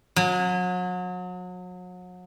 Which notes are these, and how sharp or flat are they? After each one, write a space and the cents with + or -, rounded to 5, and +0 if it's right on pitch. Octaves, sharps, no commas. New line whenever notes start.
F#3 -35